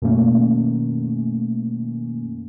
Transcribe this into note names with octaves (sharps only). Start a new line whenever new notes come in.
F#2 B2 D#3 A3 A#3 C#4